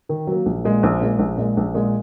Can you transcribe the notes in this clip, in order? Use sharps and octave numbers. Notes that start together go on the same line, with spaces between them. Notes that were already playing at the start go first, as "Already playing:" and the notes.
D#3
F#3 A#3
A#1
A#2 G#3
A#1
A#2 G#3
A#1
A#2 G#3
A#1
A#2 G#3